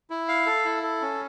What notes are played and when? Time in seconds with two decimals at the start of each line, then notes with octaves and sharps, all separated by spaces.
0.10 E4
0.28 F5
0.46 A4
0.65 E4
0.83 A4
1.01 C#4